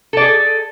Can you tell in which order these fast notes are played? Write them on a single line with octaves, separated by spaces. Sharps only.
A4 D5 G#4